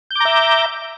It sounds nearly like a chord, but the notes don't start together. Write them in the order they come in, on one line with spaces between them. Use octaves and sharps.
G6 D6 A#5 E5